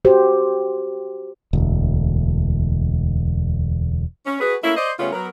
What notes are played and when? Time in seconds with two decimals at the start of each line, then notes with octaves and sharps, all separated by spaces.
0.05 F#4 G4 C5
1.53 E1 D2
4.26 C#4
4.41 F#4 G#4 B4
4.63 A3 A#3 C#4 E4
4.77 C5 D5 D#5
5.00 C#3 G3 A3 B3 C#4 F4
5.13 F#3 B3 A#4